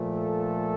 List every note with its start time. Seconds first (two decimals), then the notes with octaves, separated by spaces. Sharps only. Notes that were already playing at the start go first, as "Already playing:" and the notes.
Already playing: A#2 F3 A3
0.16 A4